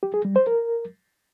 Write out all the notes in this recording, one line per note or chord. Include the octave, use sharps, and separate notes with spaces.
G4
G#4
G3
C5
A#4